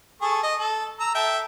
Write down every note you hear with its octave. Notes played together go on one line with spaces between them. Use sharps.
G#4 A4 C#6
D#5
A4
A#5 E6
A4 E5 G5